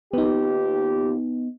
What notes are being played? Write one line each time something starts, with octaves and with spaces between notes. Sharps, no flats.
D#2 B3 D#4 F4 G4